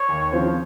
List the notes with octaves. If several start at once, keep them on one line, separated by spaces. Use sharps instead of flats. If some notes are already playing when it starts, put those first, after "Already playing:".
Already playing: C#5
D#2
C#3 F3 C4 F4